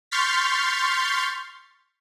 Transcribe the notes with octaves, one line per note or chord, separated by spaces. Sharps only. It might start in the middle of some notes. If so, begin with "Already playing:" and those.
C6 C#6 F6 G6 A6 B6